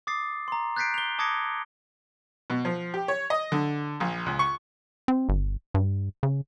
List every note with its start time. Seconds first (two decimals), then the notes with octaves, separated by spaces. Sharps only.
0.07 D6 D#6 A6 C7
0.48 A#5 C6
0.76 F#6 G6 A6 B6 C7 D7
0.94 F7 G7
1.19 A5 D6 D#6 G#6 A#6 C#7
2.50 B2
2.65 F3
2.94 G4
3.08 C#5
3.30 D#5
3.52 D3
4.00 A#1
4.26 C#2
4.39 C#6
5.08 C4
5.29 G1
5.74 G2
6.23 C#3